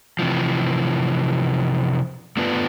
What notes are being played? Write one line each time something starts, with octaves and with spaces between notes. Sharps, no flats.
C3 E3 F3
A3 B3 D4 F4 B4